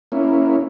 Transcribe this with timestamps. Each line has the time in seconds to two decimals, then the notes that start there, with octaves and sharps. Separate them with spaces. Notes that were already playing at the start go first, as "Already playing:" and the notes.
0.12 A#3 C#4 E4